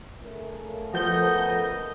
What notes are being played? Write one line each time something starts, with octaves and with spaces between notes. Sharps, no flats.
C#3 A3 A#4
F3 B3 A4 D#5 G6